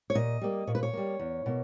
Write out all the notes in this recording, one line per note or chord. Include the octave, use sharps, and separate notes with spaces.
C#5
A#2 D#5
G3 A#3
A#2 C#5
B4
C#5
G3 A#3
E2
B2 A#3